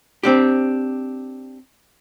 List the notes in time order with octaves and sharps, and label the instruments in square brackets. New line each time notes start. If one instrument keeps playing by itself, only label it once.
[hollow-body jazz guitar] C4 D4 G4